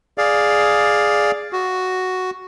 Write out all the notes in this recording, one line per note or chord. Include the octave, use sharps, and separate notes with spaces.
G#4 D5 F5
F#4